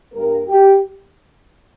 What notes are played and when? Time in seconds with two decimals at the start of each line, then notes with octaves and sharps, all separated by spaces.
0.13 G2 G3 A#3 A#4
0.47 G4